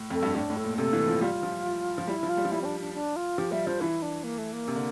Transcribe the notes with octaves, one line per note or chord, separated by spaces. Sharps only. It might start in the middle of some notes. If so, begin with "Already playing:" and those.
Already playing: A2
F2 A4
G2
A2 D4
A2
A4
A#2
C3 A4
E3
F3
G3 F4
F3
F3
G3 E4
F3
F4
G3
F3
G3 E4
C4
D4
D4
D4
F4
F3 G4
G3 E5
F3 C5
E3 E4
D4
A#3
A3
A#3
C3
D3